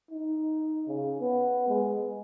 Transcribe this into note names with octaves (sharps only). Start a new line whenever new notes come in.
D#4
C#3
B3
G#3